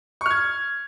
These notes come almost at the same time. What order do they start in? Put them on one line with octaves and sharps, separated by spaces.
C#6 F6 G#6